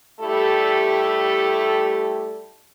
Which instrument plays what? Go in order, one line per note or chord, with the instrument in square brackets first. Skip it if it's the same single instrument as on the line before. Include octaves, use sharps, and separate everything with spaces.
[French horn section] G3 A3 E4 G4 A4